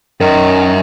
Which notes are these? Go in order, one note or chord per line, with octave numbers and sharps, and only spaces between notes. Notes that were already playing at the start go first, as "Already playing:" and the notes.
F#2 D#3 A#4